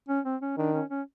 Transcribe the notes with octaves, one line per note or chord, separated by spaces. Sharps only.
C#4
C4
C#4
D#3 D4
C#4
C#4